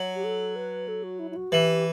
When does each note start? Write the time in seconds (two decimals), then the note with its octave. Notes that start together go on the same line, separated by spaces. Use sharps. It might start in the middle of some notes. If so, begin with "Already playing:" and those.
Already playing: F#3
0.15 G4
0.24 A4
0.56 B4
0.88 A4
1.03 F#4
1.19 E4
1.31 E4
1.36 F#4
1.51 E3 G4